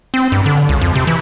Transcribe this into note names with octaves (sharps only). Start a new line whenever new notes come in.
C4
G2
D3
C#2
F2
C3
E3